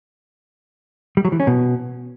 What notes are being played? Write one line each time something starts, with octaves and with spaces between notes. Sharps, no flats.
G3
F#3
E3
C#4
B2